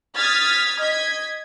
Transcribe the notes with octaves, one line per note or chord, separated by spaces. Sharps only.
D#6 F6 G#6 A6 B6
D#5 G#6 B6